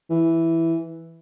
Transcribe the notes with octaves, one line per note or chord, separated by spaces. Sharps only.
E3